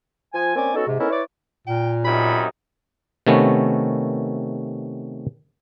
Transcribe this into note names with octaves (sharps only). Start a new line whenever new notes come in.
F3 G#5
A#3 C4 C#4 D5 G#5
B3 C#4 D#4 F#4 A4
G#2 C3
B3 C#4 D#4 E4 A4 A#4
E4 B4 C#5 D5
A#2 G5
F#2 C3 D#4 B5
C3 D#3 A3 B3 C#4